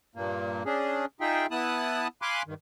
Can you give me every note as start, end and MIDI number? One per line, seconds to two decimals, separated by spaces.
0.15 0.63 43
0.15 0.63 46
0.15 0.63 58
0.66 1.05 61
0.66 1.05 62
0.66 1.05 68
1.21 1.46 63
1.21 1.46 65
1.21 1.46 68
1.21 1.46 76
1.21 1.46 79
1.51 2.08 59
1.51 2.08 64
1.51 2.08 81
1.51 2.08 87
1.51 2.08 90
2.22 2.43 77
2.22 2.43 80
2.22 2.43 83
2.22 2.43 84
2.22 2.43 86
2.22 2.43 90
2.47 2.54 43
2.47 2.54 51